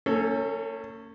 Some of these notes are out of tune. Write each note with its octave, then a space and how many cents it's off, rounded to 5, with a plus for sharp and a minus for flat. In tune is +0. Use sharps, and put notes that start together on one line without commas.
A#3 -45 C#4 +0 A4 +0